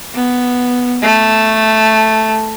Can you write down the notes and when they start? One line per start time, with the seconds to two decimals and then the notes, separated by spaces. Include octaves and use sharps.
0.15 B3
1.02 A3